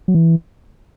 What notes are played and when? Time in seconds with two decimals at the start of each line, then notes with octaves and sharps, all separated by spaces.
0.08 F#3
0.15 E3